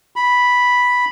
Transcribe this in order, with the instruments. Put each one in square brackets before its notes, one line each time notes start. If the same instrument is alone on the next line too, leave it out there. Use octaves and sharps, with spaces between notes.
[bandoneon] B5